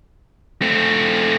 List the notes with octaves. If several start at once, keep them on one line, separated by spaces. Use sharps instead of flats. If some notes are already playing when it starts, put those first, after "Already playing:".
A3 C4